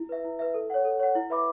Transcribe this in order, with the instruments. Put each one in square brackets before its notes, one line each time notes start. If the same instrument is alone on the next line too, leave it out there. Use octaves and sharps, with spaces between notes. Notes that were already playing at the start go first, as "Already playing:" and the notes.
Already playing: [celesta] E4
B4 E5
E4
B4 E5
A4
C#5 F#5
A4
C#5 F#5
E4
B4 E5 B5 D6